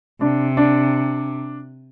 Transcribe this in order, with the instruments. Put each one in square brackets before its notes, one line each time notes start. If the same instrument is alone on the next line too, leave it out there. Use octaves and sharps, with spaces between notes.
[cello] C3 [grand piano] D4
[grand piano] D4